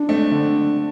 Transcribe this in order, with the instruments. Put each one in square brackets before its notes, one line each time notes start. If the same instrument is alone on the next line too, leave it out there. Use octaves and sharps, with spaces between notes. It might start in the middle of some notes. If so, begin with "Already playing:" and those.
Already playing: [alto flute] D4
[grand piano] A3 C4
D3